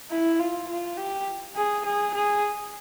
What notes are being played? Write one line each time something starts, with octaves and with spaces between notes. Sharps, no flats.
E4
F4
F4
G4
G#4
G#4
G#4